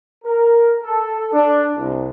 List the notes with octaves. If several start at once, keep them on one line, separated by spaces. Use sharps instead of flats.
A#4
A4
D4
C2